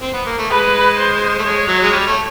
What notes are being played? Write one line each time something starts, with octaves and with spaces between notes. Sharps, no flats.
C4
B3
A#3
A3
G#3 B4
C5
A3
G#3 C#5
F#3
G#3
G3
A3